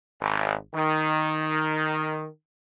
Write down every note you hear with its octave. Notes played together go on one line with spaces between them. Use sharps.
G#1
D#3